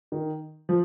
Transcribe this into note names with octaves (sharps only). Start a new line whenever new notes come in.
D#3
F3